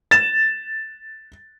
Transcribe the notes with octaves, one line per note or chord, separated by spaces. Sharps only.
A6 E7